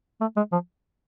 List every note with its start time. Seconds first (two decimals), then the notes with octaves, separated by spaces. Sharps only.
0.21 A3
0.36 G#3
0.52 F3